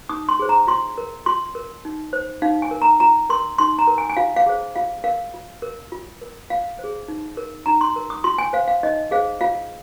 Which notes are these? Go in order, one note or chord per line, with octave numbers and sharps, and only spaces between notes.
D#4 D#6
C6
G#4 C5
A#5
F4 C6
A#4
F4 C6
A#4
D#4
C5
D#4 F5
G#5
A#4
A#5
F4 A#5
A#4 C6
D#4 C6
A#5
A#4
G#5
G#5
F4 F5
F5
G#4 C5
F4 F5
A#4 F5
F4
A#4
F4
A#4
F4 F5
C5
G#4
D#4
A#4
D#4 A#5
C6
A#4
D#6
F4 C6
G#5
C5 F5
F5
D#4 D#5
G#4 C5 F5
F4 F5